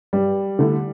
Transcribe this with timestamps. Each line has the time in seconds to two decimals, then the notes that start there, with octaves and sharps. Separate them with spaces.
0.13 G2 G3
0.59 D3 A3 E4